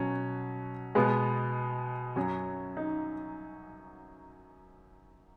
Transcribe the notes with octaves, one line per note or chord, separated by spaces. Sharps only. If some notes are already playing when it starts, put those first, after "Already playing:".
Already playing: B2 F#3 C#4
B2 G#3 B3
F#2 F#3 C#4
D#4